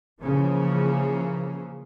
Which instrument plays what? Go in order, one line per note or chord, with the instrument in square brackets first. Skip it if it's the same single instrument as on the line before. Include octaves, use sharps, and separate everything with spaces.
[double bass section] C#3 E3 F3 A#3 C#4